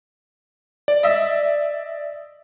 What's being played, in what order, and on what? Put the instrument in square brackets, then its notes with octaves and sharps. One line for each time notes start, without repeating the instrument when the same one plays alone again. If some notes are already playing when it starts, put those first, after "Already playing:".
[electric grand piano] D5
[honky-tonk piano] D#5 E5